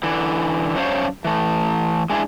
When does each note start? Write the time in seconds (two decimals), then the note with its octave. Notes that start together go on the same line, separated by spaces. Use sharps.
0.03 D3 E3
0.76 F#2 C#4 D4 C5 C#5 F5
1.25 E3 A3
2.10 G#3 D4 E4 G#4